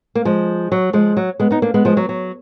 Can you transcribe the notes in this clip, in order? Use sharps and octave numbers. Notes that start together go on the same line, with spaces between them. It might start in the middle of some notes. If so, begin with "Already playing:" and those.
A#3
F3 G#3
F#3
F3 G#3
F#3
G#3 B3
B3 D#4
A#3 D4
G#3 B3
F3 G#3
F#3
F#3